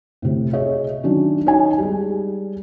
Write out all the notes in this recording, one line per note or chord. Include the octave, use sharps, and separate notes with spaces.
A2 C3
G#4 C#5 D#5 E5
D#3 F#3 C#4 D4
D#4 C#5 D#5 G#5
G3 G#3